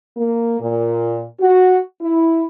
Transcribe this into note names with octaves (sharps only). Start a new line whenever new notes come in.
A#3
A#2
F#4
E4